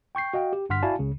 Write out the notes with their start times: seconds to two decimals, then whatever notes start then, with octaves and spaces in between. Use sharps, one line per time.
0.15 G5 C#6 G6 C7
0.33 F#4 D#5 F5 G5
0.53 G4
0.69 G1 G2 F#5 C6 F6 B6
0.83 E4 F#4 D5 F5 G#5 A5
0.99 C#2 C#3